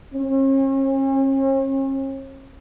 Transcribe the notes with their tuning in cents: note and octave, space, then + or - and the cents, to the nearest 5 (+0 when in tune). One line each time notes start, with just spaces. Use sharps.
C#4 -40